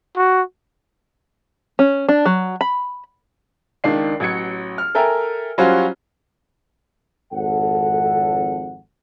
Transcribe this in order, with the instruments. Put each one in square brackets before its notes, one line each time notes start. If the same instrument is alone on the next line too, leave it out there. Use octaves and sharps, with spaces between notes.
[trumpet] F#4
[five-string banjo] C#4
D4
F#3
B5
[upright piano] C#2 D#3 D4 C7
A1 F#3 G#6 C#7
F6
A4 A#4 E5 G5 G#5 A#5
F#3 G3 C#4 F4 F#4 C5
[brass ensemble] G#1 F2 A4 F#5